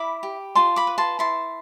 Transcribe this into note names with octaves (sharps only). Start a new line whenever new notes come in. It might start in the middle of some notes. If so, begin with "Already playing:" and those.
Already playing: E4 B5 D6
G4
F4 A5 C6
B5 D6
B4
A5 C6
E4 A5 C6